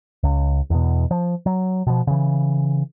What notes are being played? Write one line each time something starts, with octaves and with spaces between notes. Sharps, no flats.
C#2
E2 B2
F3
F#3
B2 F3
C#3 E3